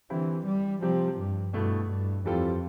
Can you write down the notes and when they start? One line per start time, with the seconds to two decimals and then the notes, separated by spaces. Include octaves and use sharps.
0.10 D3 E3 G3 C4 E4
0.46 G3
0.82 C3 F3 G3 C4 G4
1.18 G2
1.53 G2 B2 A3 E4 A4
1.90 G2
2.25 F2 E3 G3 C4 F4 A4